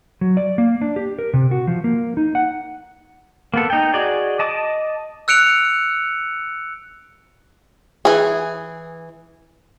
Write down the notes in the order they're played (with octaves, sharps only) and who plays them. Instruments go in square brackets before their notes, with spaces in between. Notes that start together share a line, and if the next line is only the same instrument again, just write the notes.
[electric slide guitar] F#3
D5
A#3
D4
G4
A#4
C3
F#4
F3
A#3
D#4
F#5
[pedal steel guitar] A#3 B3 A4
D#4 G5
F#4 G#4 D5 D#5 G#5
D#5 A5 D6 D#6
[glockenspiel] E6 F#6 C#7 D7 F7
[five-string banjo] E3 G#4